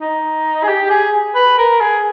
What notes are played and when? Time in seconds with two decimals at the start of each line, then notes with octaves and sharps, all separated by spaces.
0.01 D#4
0.63 G#4
0.68 G4
0.90 G#4
1.35 B4
1.58 A#4
1.81 G#4